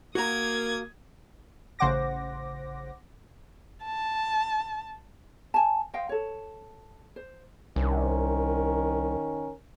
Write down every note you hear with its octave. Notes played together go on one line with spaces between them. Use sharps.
A#3 F#4 A#5 D#6 G#6
A1 C#3 C5 F#5 D6 A#6
A5
G#5 A5
C5 D#5 F5 G5
A4 C#5
C5
C2 D#3 C#4 A#4